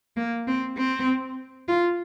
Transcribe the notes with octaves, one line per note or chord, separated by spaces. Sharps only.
A#3
C4
C4
F4